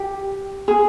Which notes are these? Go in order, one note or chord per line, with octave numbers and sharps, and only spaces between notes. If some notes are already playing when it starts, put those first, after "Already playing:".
Already playing: G4
G#4